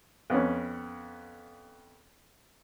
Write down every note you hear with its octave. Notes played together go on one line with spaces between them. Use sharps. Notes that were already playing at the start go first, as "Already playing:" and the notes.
F2 B3 C#4